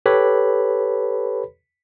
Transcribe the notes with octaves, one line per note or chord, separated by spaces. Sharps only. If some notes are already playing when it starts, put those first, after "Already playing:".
G4 A4 B4 C#5 B5